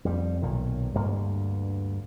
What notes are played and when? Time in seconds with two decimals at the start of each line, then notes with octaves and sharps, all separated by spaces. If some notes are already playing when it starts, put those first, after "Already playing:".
0.05 F2 G3
0.42 B1 A#2 D#3
0.94 D2 G2 A#3